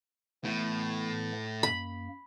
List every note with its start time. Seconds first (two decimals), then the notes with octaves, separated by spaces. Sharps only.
0.44 A2 E3 A3 B3
1.63 F#2 A#3 B5